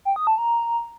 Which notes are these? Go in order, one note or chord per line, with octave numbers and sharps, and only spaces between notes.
G5
D#6
A5
A#5